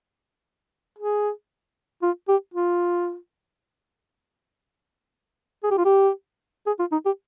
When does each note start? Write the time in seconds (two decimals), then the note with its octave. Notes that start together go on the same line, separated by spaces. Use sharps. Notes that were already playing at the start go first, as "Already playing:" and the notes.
0.98 G#4
2.02 F4
2.28 G4
2.54 F4
5.63 G#4
5.71 G4
5.77 F4
5.85 G4
6.66 G#4
6.79 F4
6.92 D#4
7.05 G4